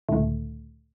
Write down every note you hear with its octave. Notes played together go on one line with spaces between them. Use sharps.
C#2 A2 D3 A3